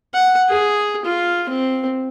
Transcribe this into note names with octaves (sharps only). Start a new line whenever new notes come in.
F#5
G#4
F4
C4